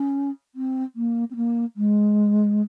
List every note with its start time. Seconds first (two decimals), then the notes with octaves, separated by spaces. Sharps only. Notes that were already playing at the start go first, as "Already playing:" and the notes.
Already playing: C#4
0.55 C4
0.95 A#3
1.30 C4
1.36 A#3
1.76 G#3